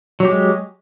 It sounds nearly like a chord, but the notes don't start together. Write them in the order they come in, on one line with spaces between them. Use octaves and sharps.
F#3 G4 G#3